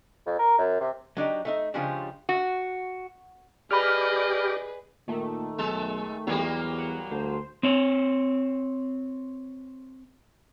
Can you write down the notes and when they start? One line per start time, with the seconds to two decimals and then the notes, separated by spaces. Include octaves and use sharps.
0.26 F2
0.39 A#4
0.58 F#2
0.81 C3
1.17 F#3 D4 D#4 G4
1.45 A3 D#4 E5
1.74 C#3 F3 G3 G#3 C#4 D4
2.29 F#4
3.71 G4 G#4 B4 D5 D#5 B5 F6
5.08 A#2 D#3 A3
5.58 B1 G#3 A4
6.27 E2 F#3 G3 A#3
6.79 F#5
7.11 D2 C5
7.63 C4 C#5